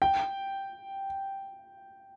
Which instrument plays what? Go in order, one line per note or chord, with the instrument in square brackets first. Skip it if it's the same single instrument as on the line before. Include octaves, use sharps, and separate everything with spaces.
[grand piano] G5